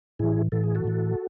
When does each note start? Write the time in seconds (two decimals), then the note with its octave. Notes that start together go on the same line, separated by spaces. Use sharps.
0.19 A2 E3 E4 G#4
0.52 A2 E3 A4
0.64 G#4
0.75 F#4 A4
0.84 A2 E3